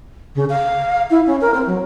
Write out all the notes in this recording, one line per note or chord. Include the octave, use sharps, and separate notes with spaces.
C#3
F5
E4
C#4
A#4
C4
F#3